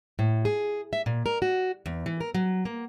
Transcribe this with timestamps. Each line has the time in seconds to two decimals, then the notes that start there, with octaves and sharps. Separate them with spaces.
0.19 A2
0.45 G#4
0.93 E5
1.06 A#2
1.26 A#4
1.42 F#4
1.86 E2
2.06 E3
2.20 A#4
2.34 F#3
2.65 A#3